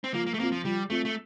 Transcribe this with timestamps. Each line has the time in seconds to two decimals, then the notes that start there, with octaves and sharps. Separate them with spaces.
0.04 C4
0.14 F3 A#3
0.27 A#3
0.34 A3
0.39 A#3 C4 F4
0.52 F3
0.65 F3 G3
0.90 A3 C4 F4
1.05 A3